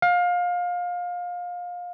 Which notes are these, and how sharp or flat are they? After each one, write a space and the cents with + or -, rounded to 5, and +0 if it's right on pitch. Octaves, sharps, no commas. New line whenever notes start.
F5 +25